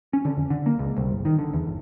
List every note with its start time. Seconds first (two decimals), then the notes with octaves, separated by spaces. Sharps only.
0.13 C#4
0.25 D3
0.37 F2
0.50 D3
0.66 A#3
0.79 C#2
0.97 C2
1.10 G1
1.25 D#3
1.39 D3
1.54 E2
1.67 G1